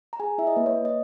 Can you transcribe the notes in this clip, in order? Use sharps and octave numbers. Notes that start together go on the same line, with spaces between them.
A#5
G#4 G#5
E4 E5
D#5
A#3 B4
C#5
A#3
D#5